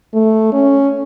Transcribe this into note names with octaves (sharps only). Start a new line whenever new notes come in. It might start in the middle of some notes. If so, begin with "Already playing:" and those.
A3
C#4